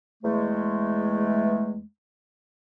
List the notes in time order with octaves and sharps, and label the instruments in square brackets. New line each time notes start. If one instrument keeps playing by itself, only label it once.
[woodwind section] E2 G#3 A3